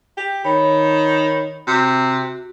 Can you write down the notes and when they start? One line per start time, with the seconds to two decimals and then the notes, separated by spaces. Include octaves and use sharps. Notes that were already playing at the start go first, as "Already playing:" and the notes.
0.17 G4
0.45 D#3 C#5 B5
1.67 C3 F#4